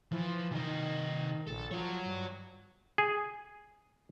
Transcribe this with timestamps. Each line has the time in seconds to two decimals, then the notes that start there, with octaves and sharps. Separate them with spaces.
0.12 E3 F3
0.52 C3 D#3 D#5
1.48 A#1 A4
1.71 F3 F#4 C#5
2.06 G2
2.98 G#4